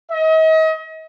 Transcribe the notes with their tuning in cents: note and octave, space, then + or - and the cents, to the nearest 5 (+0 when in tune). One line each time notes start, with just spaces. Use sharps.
D#5 +40